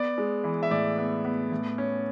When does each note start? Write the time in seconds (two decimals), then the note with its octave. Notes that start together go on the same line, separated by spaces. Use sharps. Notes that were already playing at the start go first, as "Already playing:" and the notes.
Already playing: B3 D5
0.18 G#3
0.44 E3
0.63 E5
0.71 A2 D5
0.98 B3
1.25 B3
1.52 A2
1.78 C#4